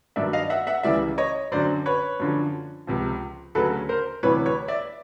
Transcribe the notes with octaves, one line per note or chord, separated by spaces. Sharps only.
G2 D#3 F#3 D5 E5
D#5 F5
E5 F#5
E5 F#5
C#2 C#3 E3 G3 D5 E5
C#5 D#5
F#2 D3 F#3 C5 D5
B4 C#5
F#2 D3 F3
C#2 C3 F3
D2 C#3 F#3 A4 B4
A#4 C5
D2 C3 E3 G3 B4 C#5
B4 C#5
D5 E5